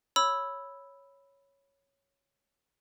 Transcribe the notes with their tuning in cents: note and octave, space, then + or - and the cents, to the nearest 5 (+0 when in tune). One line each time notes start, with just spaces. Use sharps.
C#5 +0 B5 +0 E6 +0